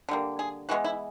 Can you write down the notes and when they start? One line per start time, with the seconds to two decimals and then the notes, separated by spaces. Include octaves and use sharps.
0.09 D3 G3 A#3
0.39 G#4
0.69 E3 G#3 B3 F#4
0.84 E4